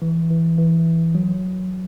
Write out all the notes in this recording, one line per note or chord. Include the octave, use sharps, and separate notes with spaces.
E3
E3
E3
F#3